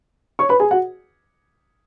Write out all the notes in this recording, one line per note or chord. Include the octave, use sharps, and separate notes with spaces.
C#5 C#6
B4 B5
G#4 G#5
F#4 F#5